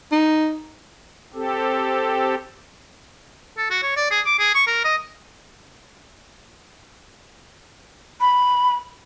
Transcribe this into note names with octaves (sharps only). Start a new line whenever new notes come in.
D#4
C4 G4 A4
A4
F#4
C#5
D5
G#4
D6
G#4
C#6
A#4
D#5
B5